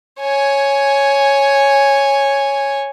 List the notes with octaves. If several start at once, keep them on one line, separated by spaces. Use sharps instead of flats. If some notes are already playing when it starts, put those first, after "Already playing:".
C#5 G#5